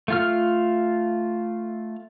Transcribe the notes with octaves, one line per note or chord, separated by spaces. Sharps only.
A3 F4 F6